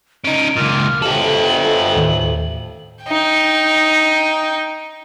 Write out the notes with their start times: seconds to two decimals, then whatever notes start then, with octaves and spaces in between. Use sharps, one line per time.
0.24 C#4 D#4 D7
0.56 C#2 A#2 F6
1.02 B1 F2 A3 G4 A4 F#7
1.96 D#2 A2 D#3
3.04 D#4 G5